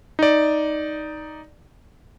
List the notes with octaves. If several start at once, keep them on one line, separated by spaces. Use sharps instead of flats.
D#4 D5